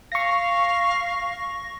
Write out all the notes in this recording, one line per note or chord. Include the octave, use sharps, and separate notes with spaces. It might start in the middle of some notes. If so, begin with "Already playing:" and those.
F5 C#6 A#6